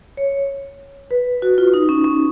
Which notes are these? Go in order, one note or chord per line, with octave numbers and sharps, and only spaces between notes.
C#5
B4
F#4
F4
D#4
C#4
C#4